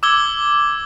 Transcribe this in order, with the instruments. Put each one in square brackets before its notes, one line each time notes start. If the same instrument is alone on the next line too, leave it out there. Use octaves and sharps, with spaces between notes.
[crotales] D6 E6 G#6 G7